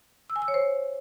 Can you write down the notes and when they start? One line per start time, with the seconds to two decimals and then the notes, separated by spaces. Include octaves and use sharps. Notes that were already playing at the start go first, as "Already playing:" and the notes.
0.30 E6
0.36 G#5
0.42 E6
0.48 C#5
0.54 C5